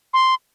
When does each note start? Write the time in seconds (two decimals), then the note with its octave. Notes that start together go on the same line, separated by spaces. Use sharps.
0.13 C6